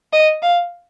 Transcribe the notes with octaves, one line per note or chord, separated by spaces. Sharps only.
D#5
F5